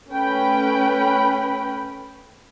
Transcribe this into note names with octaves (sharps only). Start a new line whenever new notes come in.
A3 C#4 B4 G5 B5